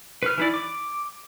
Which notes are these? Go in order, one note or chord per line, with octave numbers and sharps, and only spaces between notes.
B4 F6
E3 E4 D5
D6